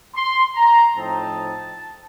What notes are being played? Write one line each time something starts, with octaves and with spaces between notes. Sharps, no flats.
C6
A#5
A2 F3 C4 D#4 A5